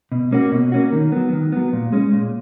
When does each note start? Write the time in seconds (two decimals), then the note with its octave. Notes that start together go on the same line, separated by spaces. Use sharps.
0.12 B2
0.32 A#3 C#4 F#4
0.52 B2
0.72 A#3 C#4 F#4
0.92 D#3
1.12 F#3 B3
1.33 D#3
1.52 F#3 B3
1.73 A#2
1.92 G#3 C#4
2.12 A#2